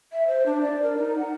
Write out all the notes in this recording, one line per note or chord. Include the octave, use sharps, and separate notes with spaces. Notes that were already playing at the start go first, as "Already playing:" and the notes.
E5
C5
D4
D5
A#4
D#4
F#5